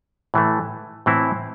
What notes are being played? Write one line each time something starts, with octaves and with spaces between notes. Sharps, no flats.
A2 E3 A3
A2 E3 C4 E4